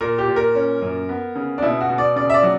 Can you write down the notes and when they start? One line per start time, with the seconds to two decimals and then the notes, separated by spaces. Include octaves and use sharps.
0.01 A#2 A#4
0.18 G4
0.28 A#2
0.36 A#4
0.55 C#4
0.82 F#2
1.09 B3
1.35 C#3
1.58 D4
1.62 B2 E4
1.80 F#4
1.90 B2
1.98 D5
2.16 C#3 D5
2.30 E5
2.34 D5
2.43 F#3